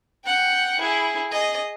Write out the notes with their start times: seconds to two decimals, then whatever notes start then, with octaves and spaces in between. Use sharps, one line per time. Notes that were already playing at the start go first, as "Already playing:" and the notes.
0.25 F#5 G5
0.79 E4 G#4
1.30 G#4 D#5